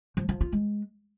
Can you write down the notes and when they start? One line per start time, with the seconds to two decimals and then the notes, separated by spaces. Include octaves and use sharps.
0.17 F3
0.29 F3
0.41 F4
0.53 G#3